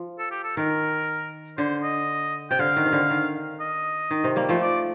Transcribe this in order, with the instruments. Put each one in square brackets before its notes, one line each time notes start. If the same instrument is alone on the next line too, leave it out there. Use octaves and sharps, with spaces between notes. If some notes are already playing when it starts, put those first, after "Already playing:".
Already playing: [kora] F3
[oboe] A4
G4
A4
[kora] D#3 [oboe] A#4
[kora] D3 [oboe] C5
[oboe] D#5
[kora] C3 [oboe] G5
[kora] D3 [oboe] F5
[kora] D#3
C3
D3
D#3
[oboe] D#5
[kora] D#3
C3
G3 A#3
F3 A3
[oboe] D5